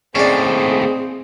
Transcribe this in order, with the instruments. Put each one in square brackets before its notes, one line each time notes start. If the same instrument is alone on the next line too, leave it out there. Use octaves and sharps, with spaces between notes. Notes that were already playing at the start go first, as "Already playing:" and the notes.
[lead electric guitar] D#2 A2 [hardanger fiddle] C4 [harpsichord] C#4 D5 [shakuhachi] G#4